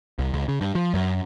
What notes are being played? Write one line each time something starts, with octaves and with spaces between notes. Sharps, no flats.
C2
C#2
C#3
G2
F3
F#2